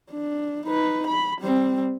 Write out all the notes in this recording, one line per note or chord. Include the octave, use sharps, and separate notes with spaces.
D4
D#4 B4
B5
G3 C4